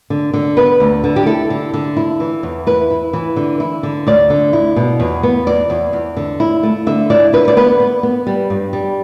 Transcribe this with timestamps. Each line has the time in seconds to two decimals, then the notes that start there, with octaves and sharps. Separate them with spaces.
0.10 D3
0.33 D3
0.57 B3 B4
0.80 D2
1.04 D3
1.16 G4
1.26 E4 A4
1.50 D3
1.74 D3
1.96 E4
2.20 E3
2.43 E2
2.67 E4 B4
2.90 E4
3.13 E3
3.36 D3
3.60 E4
3.83 D3
4.07 D2 D5
4.30 D3
4.53 E4
4.76 B2
5.00 E2
5.23 B3
5.47 E2 D5
5.70 E2
5.93 E2
6.17 D3
6.40 E4
6.63 A3
6.86 D3 E5
7.10 E4 D5
7.33 D3 B4
7.48 D5
7.57 B3 B4
7.80 B3
8.03 B3
8.27 G3
8.50 G2
8.73 G3